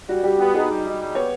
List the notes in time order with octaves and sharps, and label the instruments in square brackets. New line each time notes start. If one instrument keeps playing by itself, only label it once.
[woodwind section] G3 [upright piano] F#4
[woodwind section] G3 [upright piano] G4
[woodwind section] B3 [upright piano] G4
[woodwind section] D#4 [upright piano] G#4
[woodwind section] G3
D#4
G3
[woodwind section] B3 [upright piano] C#5